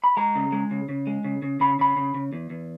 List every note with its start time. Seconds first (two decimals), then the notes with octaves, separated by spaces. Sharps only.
0.04 B5
0.17 G#3 A#5
0.35 C#3
0.52 G#3
0.71 C#3
0.89 C#3
1.07 G#3
1.24 C#3
1.42 C#3
1.60 C#3 B5
1.79 C#3 B5
1.96 C#3
2.14 C#3
2.33 E2
2.50 E2